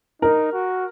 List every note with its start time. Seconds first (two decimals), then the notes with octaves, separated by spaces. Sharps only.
0.22 D#4 A#4
0.53 F#4